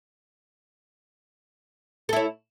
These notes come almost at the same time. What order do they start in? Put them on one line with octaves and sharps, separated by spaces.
A4 E4 C#5